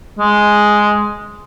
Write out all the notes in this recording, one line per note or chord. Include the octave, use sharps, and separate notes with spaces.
G#3